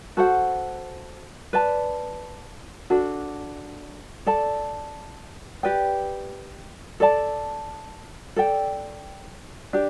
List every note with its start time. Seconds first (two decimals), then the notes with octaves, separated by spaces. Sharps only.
0.17 F#4 A4 C5 F#5
1.53 B4 D5 A5
2.90 D4 F#4 A4
4.26 A4 D5 A5
5.63 G4 B4 D5 G5
7.00 A4 D5 A5
8.36 A4 D5 G5
9.73 D4 G4